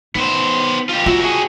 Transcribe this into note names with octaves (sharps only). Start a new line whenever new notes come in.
B3 D#4 C5
F4 G4
F4 F#4 E5
F#4 G#4